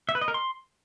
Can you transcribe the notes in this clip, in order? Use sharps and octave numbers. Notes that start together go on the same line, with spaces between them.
E5
B4
D#5
A#4
C6